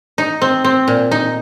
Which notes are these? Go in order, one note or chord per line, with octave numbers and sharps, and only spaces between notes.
D#4
C4
C4
A#2
D#4